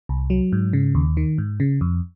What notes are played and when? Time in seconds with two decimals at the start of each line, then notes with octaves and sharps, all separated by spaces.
0.09 C2
0.30 F#3
0.52 G#2
0.73 C#3
0.95 D#2
1.17 D#3
1.38 G#2
1.60 C#3
1.81 F2